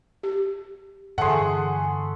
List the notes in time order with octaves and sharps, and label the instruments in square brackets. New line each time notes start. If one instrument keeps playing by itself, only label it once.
[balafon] G4
[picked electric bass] G2 D3 E3 [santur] A3 C6 [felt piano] G#4 F#5